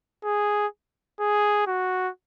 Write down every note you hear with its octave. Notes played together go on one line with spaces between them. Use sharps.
G#4
G#4
F#4